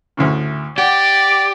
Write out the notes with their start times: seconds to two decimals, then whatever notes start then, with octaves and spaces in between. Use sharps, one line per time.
0.17 D2 A2 C#3
0.78 G4 D5 F#5